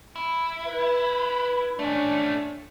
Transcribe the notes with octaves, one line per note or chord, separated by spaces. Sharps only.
E4
B4
A3 C#4 D4